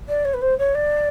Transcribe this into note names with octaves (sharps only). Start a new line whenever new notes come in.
D5
C#5
B4
C5
C#5
D5